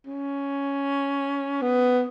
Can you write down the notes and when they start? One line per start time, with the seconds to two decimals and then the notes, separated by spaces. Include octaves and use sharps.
0.07 C#4
1.62 B3